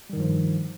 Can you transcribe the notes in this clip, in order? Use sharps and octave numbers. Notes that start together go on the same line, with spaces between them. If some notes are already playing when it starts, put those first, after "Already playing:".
G2 D#3 F3 G3